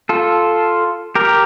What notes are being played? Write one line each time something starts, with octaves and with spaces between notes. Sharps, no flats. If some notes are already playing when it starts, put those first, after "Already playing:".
F4 A4
G4 A#4